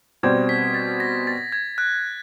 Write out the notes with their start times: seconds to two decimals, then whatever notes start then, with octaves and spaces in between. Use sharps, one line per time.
0.23 B2 G3 C4 G#6
0.49 B6
0.74 A6
1.00 A#6
1.27 A6
1.52 G#6
1.78 F#6